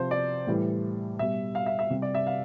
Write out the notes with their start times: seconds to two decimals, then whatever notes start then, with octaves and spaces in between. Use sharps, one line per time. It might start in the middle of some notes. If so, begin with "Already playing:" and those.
Already playing: C3 F3 C5
0.11 D5
0.47 A2 E3 G3
1.19 B2 G3 E5
1.55 F5
1.66 E5
1.79 E5
1.90 C3 G3
2.02 D5
2.15 E5
2.27 F5